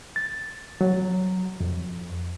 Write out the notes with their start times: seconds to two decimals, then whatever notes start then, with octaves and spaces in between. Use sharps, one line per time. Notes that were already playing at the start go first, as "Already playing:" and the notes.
0.16 A6
0.81 F#3
1.60 F2